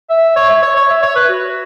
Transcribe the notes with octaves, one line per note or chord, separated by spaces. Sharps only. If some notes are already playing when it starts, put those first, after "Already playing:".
E5
C#5
E5
C#5
C#5
E5
C#5
B4
F#4